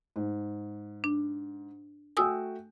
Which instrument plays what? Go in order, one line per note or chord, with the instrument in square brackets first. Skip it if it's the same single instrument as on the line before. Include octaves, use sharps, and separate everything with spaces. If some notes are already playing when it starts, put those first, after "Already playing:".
[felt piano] G#2
[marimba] D4
[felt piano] A3 F#4 G5 [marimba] G#5 D#6 E6